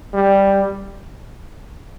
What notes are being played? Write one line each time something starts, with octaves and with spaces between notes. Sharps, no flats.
G3